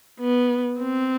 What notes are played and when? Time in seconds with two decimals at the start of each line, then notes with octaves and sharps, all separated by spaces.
0.20 B3
0.79 C4